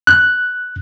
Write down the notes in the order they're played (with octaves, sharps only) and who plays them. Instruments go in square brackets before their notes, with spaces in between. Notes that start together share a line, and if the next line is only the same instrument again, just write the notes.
[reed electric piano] F#6